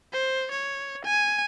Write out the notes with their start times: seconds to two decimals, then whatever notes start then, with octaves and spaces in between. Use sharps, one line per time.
0.13 C5
0.51 C#5
1.05 G#5